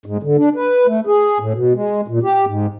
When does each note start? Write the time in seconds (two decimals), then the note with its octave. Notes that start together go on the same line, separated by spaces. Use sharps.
0.06 G#2
0.23 D3
0.38 D4
0.56 B4
0.87 A3
1.07 G#4
1.40 A2
1.54 B2
1.74 G#3
2.08 A#2
2.23 G4
2.46 G#2